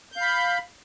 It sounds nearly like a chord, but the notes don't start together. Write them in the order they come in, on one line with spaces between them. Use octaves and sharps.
G6 F5 B5